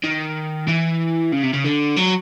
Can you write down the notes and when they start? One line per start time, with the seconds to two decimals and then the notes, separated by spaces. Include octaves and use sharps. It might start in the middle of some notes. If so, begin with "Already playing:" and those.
0.04 D#3
0.68 E3
1.33 C#3
1.43 C3
1.54 C#3
1.65 D3
1.97 F#3